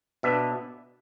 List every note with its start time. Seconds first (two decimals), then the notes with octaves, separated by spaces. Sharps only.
0.23 B2 B3 D4 E5